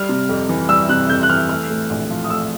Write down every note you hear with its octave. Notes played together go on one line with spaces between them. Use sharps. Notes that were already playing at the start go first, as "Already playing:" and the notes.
Already playing: G3 F6
C3
F2
E3
G3 E6
C3 F#6
F2 G6
F#6
E3 F6
A3 F6
A2
A#1
F3
D#6
A3 E6